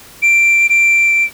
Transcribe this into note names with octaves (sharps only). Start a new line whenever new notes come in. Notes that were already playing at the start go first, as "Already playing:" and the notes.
D7
D7